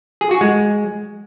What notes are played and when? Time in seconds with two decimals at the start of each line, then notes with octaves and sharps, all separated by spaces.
0.21 G#4
0.31 F#4
0.41 G#3